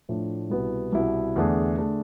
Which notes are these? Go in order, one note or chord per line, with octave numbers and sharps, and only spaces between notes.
A2 F3 A3 D4
C2 B2 B3 E4
C2 B2 B3 E4
E2 D3 A3 D4 G#4
D3 A3 D4 G#4